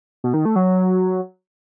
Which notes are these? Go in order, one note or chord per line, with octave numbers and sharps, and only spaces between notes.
B2
D#3
A3
F#3